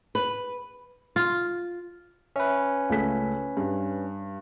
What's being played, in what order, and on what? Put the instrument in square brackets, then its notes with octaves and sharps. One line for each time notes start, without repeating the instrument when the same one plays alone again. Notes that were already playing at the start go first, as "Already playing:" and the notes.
[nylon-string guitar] B4
[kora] F4
[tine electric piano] C#4 B4 [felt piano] E5
[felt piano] C#2 A3 B6
G2